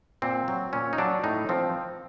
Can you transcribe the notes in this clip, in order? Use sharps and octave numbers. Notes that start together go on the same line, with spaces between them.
A#2 C4
F#3
A#2 C#4
D#4
F#3 D4
A2 D#4
F3 C4